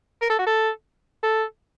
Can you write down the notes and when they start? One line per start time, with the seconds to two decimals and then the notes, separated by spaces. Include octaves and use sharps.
0.22 A#4
0.30 A4
0.39 F#4
0.47 A4
1.23 A4